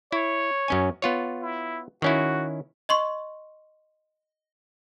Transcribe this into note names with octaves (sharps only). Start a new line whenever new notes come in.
E4 C#5
F#2 C#4 G#5
B3 F4 C#5
E4
D#3 C#4 E4 F#4
D#5 C6 C#6